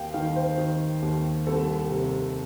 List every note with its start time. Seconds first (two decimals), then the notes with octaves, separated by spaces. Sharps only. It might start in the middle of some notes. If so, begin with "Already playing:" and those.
Already playing: D#2 F5 G5
0.14 D#3 F5
0.36 C5
0.58 D#3
1.02 D#2
1.47 C2 A4
1.91 C3